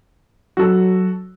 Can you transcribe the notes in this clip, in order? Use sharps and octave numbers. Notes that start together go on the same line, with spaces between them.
F#3 F#4 A4